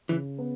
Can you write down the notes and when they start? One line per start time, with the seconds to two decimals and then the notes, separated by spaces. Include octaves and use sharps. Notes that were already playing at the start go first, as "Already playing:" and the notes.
0.09 C#3 E3
0.38 B3